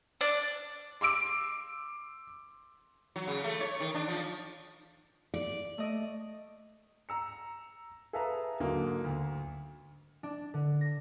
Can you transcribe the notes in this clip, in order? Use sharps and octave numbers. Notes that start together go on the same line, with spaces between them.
D4
C6 D6 E6 D7
F#3
C#3
A3
C#5
D#3
D4
F3
D5
A3 D#5
A#5 E6 C#7
G#4 A4 B4 E5 F5 A#5
G#2 D3 F#3 A#3
D2
D4
D3
A#6